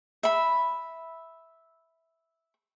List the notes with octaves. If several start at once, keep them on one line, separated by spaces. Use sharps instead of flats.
E5 B5